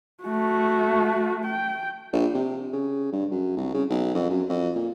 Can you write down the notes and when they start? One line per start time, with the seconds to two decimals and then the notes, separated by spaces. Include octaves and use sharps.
0.24 A3 F#4
1.45 G5
2.13 A#1
2.35 C3
2.73 C#3
3.13 G2
3.31 F#2
3.57 C2
3.74 C#3
3.90 B1
4.15 F2
4.30 F#2
4.49 F2
4.75 A#2